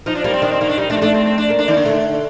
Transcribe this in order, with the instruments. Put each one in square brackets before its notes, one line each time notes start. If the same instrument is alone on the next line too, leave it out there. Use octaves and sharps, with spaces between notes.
[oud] F3 [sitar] D#4
[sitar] D4
[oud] G3 [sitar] A#3
[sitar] C4
[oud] D#3 [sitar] D4
[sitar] C4
[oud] D#3 [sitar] A#3
[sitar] D4
[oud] G3 [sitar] D#4
[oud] A3 [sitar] D4
[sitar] C4
[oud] A3 [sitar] D4
[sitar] C4
C4
D4
[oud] A#3
[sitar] D4
D#3
D3
[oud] A3